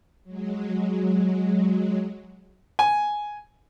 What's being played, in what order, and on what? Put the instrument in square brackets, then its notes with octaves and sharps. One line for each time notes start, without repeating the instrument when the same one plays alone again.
[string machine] F#3 G#3
[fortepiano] G#5